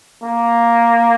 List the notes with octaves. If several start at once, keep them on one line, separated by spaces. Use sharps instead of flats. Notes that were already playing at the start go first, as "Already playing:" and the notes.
A#3